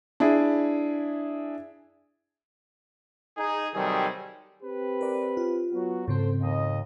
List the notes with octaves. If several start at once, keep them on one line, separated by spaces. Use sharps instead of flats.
D4 E4 G#4
D#4 G#4
C3 D#3 F#3 G3 G#4 A4
C4 G4 B4
A#4 D5
F4
F#3 B3 F#4
G#2 C#3 C4 A4 C5
D#2 D#5